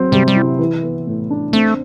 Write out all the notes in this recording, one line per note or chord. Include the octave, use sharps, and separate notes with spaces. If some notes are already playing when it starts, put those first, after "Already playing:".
Already playing: F#3 C4
C3 G3
G3
E4
E3
B3
A2
D4
A3 C4